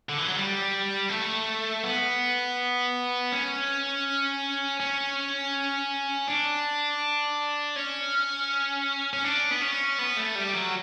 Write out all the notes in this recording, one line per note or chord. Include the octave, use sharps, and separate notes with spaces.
D3
E3
F#3
G3
A3
B3
C#4
C#4
D4
C#4
C#4
D4
B3
C#4
B3
A3
G3
F#3